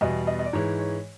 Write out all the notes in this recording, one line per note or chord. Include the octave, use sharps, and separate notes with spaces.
E2 B2 G3 D#5
D#5
D#5
D5
G#2 E3 G#3 C#5
C#5